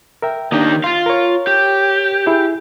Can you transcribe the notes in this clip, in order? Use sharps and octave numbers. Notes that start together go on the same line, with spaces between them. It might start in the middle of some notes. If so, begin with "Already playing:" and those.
A#4 E5 G5
D#3 A#3 D4 D#4 G4
F4 F5 C6 A6
A#4 C#5
G4
E4 G#4